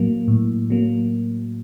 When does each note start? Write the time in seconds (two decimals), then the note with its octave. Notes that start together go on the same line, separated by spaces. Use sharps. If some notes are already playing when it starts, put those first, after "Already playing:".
Already playing: A2 F#3 A#3
0.28 A2
0.70 F#3 A#3